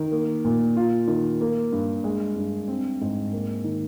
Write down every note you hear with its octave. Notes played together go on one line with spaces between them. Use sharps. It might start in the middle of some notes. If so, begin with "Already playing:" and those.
Already playing: D#3
A#3
A#2
F4
D#3
A#3
G2
G#3
G2
C4
G#2
A#3
D#3